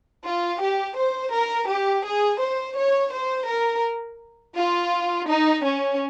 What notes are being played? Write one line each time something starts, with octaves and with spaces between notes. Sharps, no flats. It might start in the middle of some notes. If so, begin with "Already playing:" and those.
F4
G4
C5
A#4
G4
G#4
C5
C#5
C5
A#4
F4
D#4
C#4